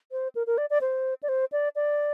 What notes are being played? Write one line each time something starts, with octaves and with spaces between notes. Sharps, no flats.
C5
A#4
A#4
D5
D5
C5
D5
C5
D5
D5